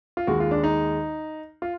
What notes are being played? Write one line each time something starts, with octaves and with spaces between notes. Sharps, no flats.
F4
D#2 D#3 G#3 F#4
F4
D4
D#4
F4